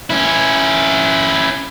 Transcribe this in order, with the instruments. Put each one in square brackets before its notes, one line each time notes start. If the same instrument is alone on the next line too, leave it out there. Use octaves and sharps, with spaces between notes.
[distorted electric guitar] C#4 E4